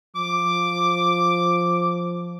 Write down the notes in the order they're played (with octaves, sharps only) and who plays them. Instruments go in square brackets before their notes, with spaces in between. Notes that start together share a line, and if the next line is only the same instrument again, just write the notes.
[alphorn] F3 [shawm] D6